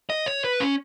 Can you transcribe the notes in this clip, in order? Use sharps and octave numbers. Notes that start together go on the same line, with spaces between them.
D#5
C#5
B4
C#4